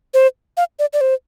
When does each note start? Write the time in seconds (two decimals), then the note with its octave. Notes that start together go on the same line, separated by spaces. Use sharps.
0.14 C5
0.57 F5
0.79 D5
0.93 D5
1.01 C5